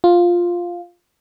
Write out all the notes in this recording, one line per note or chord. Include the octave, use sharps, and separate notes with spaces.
F4